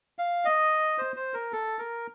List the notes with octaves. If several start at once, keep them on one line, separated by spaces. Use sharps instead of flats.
F5
D#5
C5
C5
A#4
A4
A#4